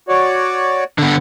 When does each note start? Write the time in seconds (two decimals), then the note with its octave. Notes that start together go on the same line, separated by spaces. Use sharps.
0.09 F#4 C#5 D5
0.99 D3 B3